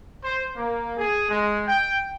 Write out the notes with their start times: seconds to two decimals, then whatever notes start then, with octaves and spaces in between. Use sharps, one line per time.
0.22 C5
0.55 A#3
0.97 G#4
1.29 G#3
1.67 G5